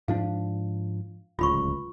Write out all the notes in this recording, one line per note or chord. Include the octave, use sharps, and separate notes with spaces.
G#2 F3 D4 F5
D1 C#2 F4 B5 C#6